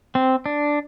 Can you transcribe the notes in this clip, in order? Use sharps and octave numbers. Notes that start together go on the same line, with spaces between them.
C4
D4